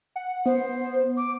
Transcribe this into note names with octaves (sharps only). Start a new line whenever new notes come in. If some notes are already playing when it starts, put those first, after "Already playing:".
F#5
B3 C5
D6